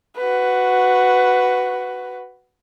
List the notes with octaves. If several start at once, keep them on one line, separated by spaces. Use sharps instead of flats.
F#4 B4